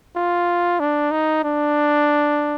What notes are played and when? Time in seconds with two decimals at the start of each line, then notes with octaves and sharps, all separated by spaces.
0.16 F4
0.80 D4
1.11 D#4
1.44 D4